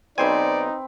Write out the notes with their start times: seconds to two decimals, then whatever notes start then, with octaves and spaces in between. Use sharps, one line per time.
0.18 B1 C4 D#4 B4 C5 D5 G#5 B5